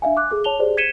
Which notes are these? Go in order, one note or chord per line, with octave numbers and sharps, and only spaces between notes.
D4 E5 F5 G#5
D6 F#6
G#4 A4 D6
C#5 A5 F7 G7
G4 G#4 C5 D5
G#6 B6 C#7 D#7 E7 G7